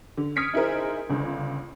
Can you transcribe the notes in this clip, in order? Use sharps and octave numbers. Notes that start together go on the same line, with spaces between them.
D3
D#6 F6 G#6 B6 C#7 D7
D#4 E4 G#4 A#4 C5
G1 C#2 D3